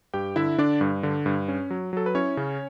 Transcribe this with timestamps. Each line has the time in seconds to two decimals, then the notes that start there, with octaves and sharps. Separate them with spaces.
0.14 G2 G4 G5
0.36 D3 E4 E5
0.58 D3 D4 D5
0.81 G2
1.03 D3
1.26 G2
1.48 C#4
1.70 F#3
1.93 F#3 A4
2.06 B4
2.15 C#4 E4 C#5
2.37 C#3